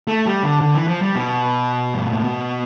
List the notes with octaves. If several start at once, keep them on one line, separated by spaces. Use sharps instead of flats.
A3
G3
D3
D3
E3
F3
G3
B2
G2
A2
B2